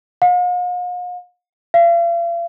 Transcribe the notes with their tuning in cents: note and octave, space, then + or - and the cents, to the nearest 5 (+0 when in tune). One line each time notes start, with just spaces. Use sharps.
F5 +45
F5 -40